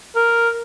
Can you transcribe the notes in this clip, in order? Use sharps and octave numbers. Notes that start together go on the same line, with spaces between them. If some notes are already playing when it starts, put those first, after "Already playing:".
A#4